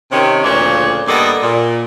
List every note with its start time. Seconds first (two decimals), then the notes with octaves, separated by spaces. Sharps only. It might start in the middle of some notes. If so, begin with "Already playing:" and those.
0.11 C3 D#3 C#4
0.44 D2 A#2 C#3 F3 D4 C#5
1.08 G2 A#3 B3 A4 D5 D#5
1.42 A#2